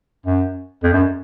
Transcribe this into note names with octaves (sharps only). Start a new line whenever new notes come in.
F#2
F2
F#2